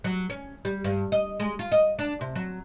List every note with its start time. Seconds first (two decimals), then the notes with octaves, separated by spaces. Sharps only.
0.04 F#3
0.30 C#4
0.65 G3
0.84 G2
1.12 D#5
1.40 G#3
1.59 F4
1.72 D#5
1.99 D4
2.21 C3
2.36 F#3